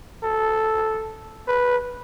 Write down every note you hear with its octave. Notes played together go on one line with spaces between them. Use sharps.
A4
B4